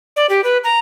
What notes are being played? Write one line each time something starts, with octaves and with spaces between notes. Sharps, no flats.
D5
G4
B4
A#5